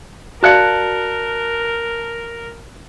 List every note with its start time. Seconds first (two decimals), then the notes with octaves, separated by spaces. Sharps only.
0.43 F#4 A#4 D5 F5 A5 F#6 C#7